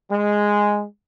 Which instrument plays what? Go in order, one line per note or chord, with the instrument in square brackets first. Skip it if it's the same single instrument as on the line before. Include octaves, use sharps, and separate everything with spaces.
[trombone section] G#3